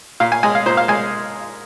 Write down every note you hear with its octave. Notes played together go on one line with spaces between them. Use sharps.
A#2 F5
G#5
G#3 G#5
F5
A#2 C5
F5
G#3 G#5